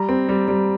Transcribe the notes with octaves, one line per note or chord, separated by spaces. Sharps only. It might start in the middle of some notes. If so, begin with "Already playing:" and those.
Already playing: G3 A#5
C4
G3
G3